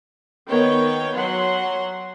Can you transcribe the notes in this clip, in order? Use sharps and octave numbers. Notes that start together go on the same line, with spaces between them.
D#3 B3 C#5 G5
F#3 F#5 C6